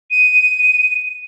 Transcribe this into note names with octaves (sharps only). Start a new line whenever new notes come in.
D#7